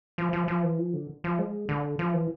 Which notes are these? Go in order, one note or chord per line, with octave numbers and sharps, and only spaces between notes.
F3
F3
F3
E3
F3
D3
F3
G#3
D3
F3
E3